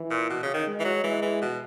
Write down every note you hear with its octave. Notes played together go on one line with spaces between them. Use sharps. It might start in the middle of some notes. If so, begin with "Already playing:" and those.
Already playing: E3
A#2
B2
C#3
D#3
G#3
E3
F#3
E3 G#3
E3
B2